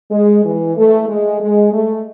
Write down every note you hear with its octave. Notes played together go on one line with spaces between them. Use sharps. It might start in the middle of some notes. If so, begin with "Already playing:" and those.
G#3
E3
A3
G#3
G#3
A3